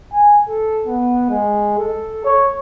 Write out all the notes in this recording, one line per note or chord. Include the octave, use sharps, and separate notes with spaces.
G#5
A4
B3
G#3
A4
C#5